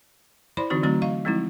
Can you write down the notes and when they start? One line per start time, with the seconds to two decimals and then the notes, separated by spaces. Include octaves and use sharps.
0.57 E4 C5 D5 B5 C6
0.70 D3 E3 C4 D#4 F#4
0.83 D3 F#3 A3 C4 F#4 A#5
1.02 D#5 F5 C#6
1.25 F3 G#3 C4 D#4 E4